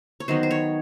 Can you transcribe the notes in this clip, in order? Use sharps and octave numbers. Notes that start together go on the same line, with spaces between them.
C#5
D#3 F#3 B3 C5
C5
C#5